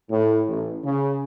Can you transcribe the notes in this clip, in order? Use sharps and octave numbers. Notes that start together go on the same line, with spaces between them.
A2
A1
C#3